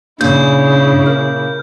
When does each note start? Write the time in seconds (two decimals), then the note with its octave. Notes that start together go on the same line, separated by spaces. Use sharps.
0.21 G2 A#2 C#3 E4 G6
1.06 A#4